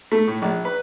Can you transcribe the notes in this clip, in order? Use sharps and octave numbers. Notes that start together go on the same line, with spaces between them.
A3
A2
A#1
B4